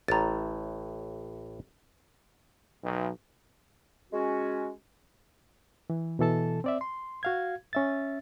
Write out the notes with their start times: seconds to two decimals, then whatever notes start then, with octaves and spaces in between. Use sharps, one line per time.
0.08 A1 A2 A#5 A6
2.84 B1
4.12 G#3 C#4 F#4
5.90 E3
6.19 B2 E3 A4 A5
6.64 C4 D5 E5
6.81 C6
7.23 F#4 F5 G#6
7.73 C#4 E5 A6